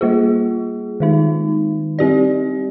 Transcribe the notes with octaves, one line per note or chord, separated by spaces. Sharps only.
G3 A#3 F4 G#4
D#3 G#3 D#4
G3 C4 G4 D5